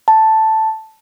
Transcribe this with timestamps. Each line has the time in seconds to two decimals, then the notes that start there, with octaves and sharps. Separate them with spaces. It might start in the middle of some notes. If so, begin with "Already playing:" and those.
0.08 A5